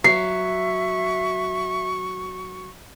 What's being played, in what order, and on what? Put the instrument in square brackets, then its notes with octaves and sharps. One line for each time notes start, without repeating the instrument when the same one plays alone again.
[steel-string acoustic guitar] F#3 [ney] E5 [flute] C#6 [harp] C7